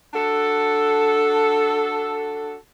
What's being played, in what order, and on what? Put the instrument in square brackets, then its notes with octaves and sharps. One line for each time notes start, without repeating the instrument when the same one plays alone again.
[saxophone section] D4 F#4 A4